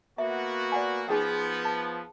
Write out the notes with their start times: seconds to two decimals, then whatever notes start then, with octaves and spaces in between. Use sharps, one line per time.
0.18 A#3 B3 F#4 E5
0.72 D5 F#5 G#5
1.09 F3 B3 D#4 G#4 G5
1.65 A5